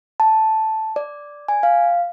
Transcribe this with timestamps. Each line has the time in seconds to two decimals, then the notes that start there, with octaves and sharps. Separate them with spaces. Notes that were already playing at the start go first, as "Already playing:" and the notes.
0.20 A5
0.96 D5
1.48 G#5
1.63 F5